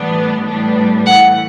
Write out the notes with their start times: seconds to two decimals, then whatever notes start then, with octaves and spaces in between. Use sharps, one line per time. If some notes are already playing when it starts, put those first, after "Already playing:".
Already playing: A2 E3 G3 B3 D4
0.46 A2 G3 B3 D4
1.06 A2 E3 A3 F#5